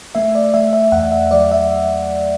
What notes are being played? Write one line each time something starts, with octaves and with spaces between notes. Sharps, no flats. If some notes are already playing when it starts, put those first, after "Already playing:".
A3 E5
D5
A3 E5
E5
E2 F#5
E5
F#3 D5
E5